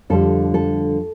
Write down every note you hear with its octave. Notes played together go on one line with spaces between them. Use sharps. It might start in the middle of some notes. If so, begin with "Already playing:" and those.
F2 D3 G3 A4
A4